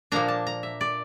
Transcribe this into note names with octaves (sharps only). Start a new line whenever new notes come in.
A#2 F3 A#3 D4 A#5
A5
A#5
E5
D5